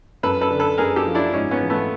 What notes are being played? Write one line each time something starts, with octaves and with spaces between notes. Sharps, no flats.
F#2 A4 B4
A4 B4
D3
A4 B4
F#2 G#4 A#4
G4 A4
F3
D4 E4
G#2 C#4 D#4
B3 C#4
E3
A3 B3